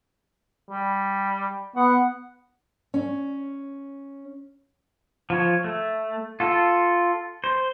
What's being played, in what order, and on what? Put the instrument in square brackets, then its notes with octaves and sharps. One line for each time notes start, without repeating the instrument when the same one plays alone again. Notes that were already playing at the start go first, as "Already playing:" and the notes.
[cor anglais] G3
[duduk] B3 [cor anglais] F#5
[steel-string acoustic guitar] C#4
[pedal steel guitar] F3 C#5
A3
F4 A4
C5